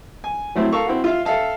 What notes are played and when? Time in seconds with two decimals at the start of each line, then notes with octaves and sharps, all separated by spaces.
0.24 G#5
0.55 F#3 A3 C4 E4
0.72 A4 A#4 F5 C#6
0.86 C4 E4 F#4
1.04 F4 E5 F5
1.25 A4 E5 F5 A5